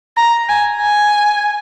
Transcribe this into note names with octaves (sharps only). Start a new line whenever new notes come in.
A#5
G#5
G#5